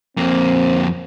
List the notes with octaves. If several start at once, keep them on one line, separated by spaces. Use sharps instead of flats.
F2 A#3 C4